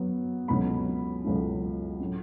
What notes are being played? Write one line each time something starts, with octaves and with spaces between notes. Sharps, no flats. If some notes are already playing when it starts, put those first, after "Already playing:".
Already playing: F#2 F#3 B3
C#2 B2 F#3 A3 C#4 B5
C#2 B2 F#3 A3 C#4
A2 F#3 A3 C#4